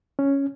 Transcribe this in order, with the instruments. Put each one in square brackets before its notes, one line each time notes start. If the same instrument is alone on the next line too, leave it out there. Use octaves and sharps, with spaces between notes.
[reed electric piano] C#4